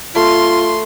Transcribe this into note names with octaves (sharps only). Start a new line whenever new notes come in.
A3 F4 C6